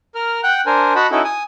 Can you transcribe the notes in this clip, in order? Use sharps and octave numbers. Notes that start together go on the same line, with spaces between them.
A#4 F6
F#5 G5 F#6 G6
D4 A#4 C5 G#5
F#4 D#5 F#5 A5 B5
C#4 D#4 E4 F#4 A4
G#5 D#6